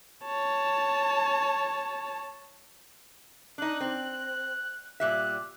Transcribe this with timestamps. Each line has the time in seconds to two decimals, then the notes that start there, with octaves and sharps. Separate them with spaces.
0.25 C#5 A5
3.58 D4 D#4 F#6
3.81 C4
5.00 A#2 G3 E5 F#6